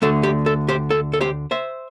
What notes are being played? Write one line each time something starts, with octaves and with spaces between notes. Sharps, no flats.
D2 D3 A3 A4
G4
A4
G4 C5
A4
A4
G4 C5
C5 E5